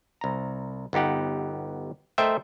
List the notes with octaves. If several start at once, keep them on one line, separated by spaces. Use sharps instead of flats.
C2 A#5
G1 B3 D#4 G4 F#5
A3 A#4 C5 D#5 E5 G5